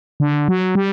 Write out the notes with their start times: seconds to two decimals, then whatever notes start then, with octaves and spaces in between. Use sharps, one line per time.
0.20 D3
0.48 F#3
0.75 G3